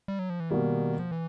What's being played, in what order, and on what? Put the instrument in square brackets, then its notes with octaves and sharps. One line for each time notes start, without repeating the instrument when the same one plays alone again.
[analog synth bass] G3
F#3
F3
E3
[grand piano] B2 G3 A#3 [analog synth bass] D#3
[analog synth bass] F3
E3